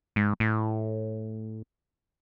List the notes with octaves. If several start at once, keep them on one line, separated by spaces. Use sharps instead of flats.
G#2
A2